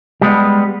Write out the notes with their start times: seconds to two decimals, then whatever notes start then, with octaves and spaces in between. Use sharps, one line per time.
0.22 G3 G#3 B3